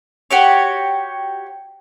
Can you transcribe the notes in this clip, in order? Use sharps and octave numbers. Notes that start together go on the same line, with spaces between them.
F#4 G4 C#5